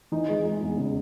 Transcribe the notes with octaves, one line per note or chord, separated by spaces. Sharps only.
E3 D#4
G#3
G#3
E2
C#3